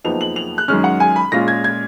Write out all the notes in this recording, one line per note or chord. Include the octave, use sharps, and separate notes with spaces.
F#1 F2 F3 B3 D#4 F7
F#7
F7
F#6
F#2 D#3 G#3 C#4 F6
F#5
G#5
B5
A#2 G#3 C#4 F4 A#6
G#6
G#6